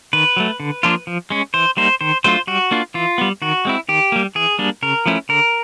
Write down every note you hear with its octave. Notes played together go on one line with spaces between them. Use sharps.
D#3 B4
F#3 A3
D3
F3 A#3 D4 F4
F3
G#3 C#4
E3 C5
G3 A#3 D#4 C5
D#3 C5
F#3 A3 D4 F4 C5
G3 F#4
A#3 D4 F4
E3 F4
G3 B3
D#3 F#4
G#3 C4 E4
D#3 G4
G3 A#3
E3 G#4
G3 A#3 D4
C#3 A#4
F3 A3 C#4 E4
D3 A#4